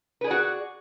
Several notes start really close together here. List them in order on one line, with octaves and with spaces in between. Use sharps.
B4 G#4 D5 F#4